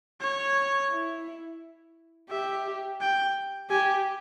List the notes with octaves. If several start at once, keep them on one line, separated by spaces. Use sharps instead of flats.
C#5
E4
G4 E5
G5
G4 G#5